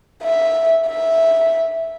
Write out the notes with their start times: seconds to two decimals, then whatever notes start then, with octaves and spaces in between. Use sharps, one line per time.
0.23 E5
0.88 E5